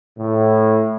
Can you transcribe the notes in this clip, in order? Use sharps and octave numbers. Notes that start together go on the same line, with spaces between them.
A2